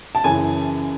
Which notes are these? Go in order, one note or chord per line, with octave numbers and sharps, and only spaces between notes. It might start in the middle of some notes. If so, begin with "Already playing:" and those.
A5
F#2 C#3 E3 G#5